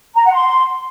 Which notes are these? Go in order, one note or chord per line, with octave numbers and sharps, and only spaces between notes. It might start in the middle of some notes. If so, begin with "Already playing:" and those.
A#5
F#5
C6